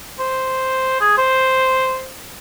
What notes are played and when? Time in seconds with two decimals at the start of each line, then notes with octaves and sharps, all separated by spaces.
0.19 C5
1.01 G#4
1.18 C5